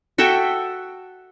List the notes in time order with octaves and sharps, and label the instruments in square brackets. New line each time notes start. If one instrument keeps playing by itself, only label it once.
[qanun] F#4 A4 E5 G5